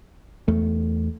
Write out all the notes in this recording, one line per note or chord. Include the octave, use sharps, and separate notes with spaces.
E2 A3